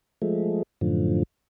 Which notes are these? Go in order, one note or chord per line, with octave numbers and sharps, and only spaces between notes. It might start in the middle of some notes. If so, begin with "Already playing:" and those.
F3 G#3 A3
F#2 A2 D3 F3